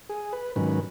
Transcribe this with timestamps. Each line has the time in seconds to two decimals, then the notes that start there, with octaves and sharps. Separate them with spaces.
0.09 G#4
0.33 B4
0.56 G#2 D#3 F#3 C#4 B4